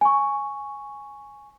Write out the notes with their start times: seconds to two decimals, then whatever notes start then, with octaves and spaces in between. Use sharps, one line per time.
0.01 G#5 C#6